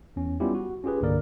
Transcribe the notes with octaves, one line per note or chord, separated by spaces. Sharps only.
E2 C#4
G3 B3 C#4 E4 F4 G4
F#4
C#4 F4 G4 G#4 B4
C2 G2 D3 A#3 A#4 D5